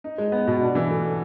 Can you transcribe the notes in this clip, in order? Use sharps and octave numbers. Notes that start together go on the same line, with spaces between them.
D#4
G#3
B3
B2
D4
E3
A3